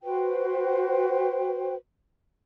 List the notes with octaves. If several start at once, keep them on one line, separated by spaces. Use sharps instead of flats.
F#4 B4 C5 G5